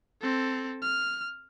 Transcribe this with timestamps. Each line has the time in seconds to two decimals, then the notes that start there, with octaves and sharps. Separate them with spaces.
0.21 C4 A4
0.82 F6